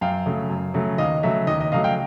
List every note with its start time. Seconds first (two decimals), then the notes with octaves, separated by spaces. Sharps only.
0.01 F#2 F5 G5
0.26 C#3 F#3 A3
0.50 F#2
0.74 C#3 F#3 A3
0.98 D#2 D#5 F5
1.23 C#3 F#3 A3 E5
1.47 D#2 D#5
1.60 D#5
1.72 C#3 F#3 A3 D#5 F5
1.84 F5 G5